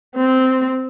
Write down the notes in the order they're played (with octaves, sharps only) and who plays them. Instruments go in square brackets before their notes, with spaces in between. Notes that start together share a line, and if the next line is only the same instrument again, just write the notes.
[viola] C4